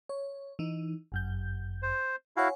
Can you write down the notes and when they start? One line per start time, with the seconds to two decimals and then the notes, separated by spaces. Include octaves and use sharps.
0.09 C#5
0.59 E3 D#4
1.12 G1 F#2 G6
1.82 C5
2.37 E4 F#4 C#5 F5 F#5 G#5